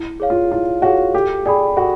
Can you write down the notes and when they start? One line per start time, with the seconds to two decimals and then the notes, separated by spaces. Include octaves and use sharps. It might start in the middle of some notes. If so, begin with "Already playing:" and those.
Already playing: E4
0.20 G#4 C#5 F5
0.30 F4
0.52 E4 F4
0.82 F#4 G#4 C#5 F5
1.14 G4 A4
1.46 G#4 D5 G5 B5
1.76 F#4 A4